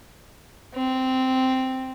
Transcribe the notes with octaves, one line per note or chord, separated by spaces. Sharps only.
C4